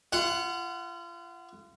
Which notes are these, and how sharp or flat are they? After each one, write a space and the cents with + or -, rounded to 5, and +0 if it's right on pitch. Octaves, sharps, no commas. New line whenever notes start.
F4 -35 F#5 +0